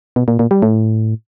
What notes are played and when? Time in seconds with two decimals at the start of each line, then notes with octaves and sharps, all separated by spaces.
0.16 B2
0.28 A#2
0.39 A#2
0.51 G3
0.62 A2